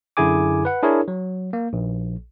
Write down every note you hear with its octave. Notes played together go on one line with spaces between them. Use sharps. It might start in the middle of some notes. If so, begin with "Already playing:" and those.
F#2 D3 E4 G#4 G#5 D6
B4 F#5
D4 E4 G#4 A#4 C#5
F#3
A#3
A#1